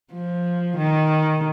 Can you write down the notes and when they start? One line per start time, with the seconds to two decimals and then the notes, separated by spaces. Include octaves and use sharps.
0.13 F3
0.77 D#3